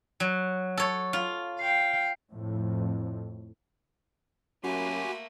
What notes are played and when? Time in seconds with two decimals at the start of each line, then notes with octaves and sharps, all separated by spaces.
0.20 F#3
0.77 A4 C#5
1.13 F4
1.59 F5 G5
2.31 F2 A2
4.63 F#2 A3 A#3 F#4 G4 G#5 B5 C6